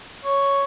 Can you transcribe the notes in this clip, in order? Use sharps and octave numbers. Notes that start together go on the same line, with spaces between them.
C#5